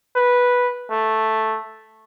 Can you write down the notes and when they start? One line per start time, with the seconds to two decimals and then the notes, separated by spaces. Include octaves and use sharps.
0.16 B4
0.91 A3